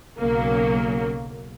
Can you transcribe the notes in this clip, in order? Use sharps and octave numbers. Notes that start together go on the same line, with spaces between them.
B1 C#3 F#3 A#3